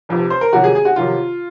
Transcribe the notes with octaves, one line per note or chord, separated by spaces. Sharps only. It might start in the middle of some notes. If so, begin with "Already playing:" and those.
F1 F2 C3
C5
A#4
F2 C3 D#3 F#3 F#4
G#4
G#4
F#4
F2 C3 D#3 F#3 F4